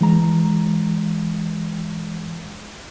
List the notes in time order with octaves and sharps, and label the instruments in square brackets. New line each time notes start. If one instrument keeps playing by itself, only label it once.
[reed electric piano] E3 G#3 A#5